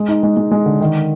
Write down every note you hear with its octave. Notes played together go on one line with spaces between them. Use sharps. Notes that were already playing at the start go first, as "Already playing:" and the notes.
Already playing: G#3
D#4
G#3
G#3
G#3
D3
D#3